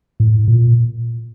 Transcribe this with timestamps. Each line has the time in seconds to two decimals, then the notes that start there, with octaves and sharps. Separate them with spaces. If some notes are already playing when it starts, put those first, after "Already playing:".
0.20 A2
0.48 A#2